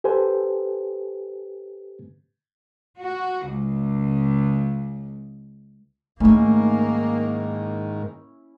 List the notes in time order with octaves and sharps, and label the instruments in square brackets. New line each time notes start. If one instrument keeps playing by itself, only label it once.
[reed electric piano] G4 A4 B4 C5 G#5
[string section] F#4
C#2
[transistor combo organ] G#2 D#3 [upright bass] A3 D#4 [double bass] A#3 [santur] C#4 E4 G#5